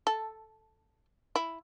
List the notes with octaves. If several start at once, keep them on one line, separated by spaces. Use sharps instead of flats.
A4
E4